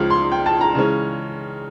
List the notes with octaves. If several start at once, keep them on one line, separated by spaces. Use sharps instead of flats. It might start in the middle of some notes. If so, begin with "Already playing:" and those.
Already playing: C#2 C#3 F3 F6
C6
G5
A5
A#5
C#3 E3 G#3 C#4